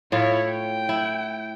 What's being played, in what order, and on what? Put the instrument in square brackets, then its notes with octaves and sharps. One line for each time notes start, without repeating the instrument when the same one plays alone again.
[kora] A2 F4 [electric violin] E4 C#5
[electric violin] G5
[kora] E4